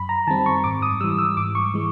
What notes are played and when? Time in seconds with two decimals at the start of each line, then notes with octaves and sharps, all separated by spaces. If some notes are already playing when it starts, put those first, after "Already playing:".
Already playing: F#2 B5
0.09 A#5
0.27 D#3 G3 C4 A5
0.46 C#6
0.64 G#2 D6
0.82 D#6
1.01 E3 G3 E6
1.18 E6
1.37 G#2 D6
1.55 C#6
1.74 E3 G#3